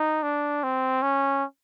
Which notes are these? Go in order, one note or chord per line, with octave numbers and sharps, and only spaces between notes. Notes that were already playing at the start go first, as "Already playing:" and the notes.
Already playing: D#4
D4
C4
C#4